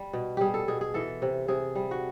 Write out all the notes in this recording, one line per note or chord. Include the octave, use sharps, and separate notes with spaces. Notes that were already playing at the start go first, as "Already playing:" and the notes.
Already playing: G3
B2
G3 G4 G#4
A4
B2 G#4
G#4
E3 A4
C3
C3 G#4
G3
F#4